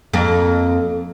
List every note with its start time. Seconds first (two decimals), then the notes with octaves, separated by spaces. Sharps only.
0.13 F2 A#3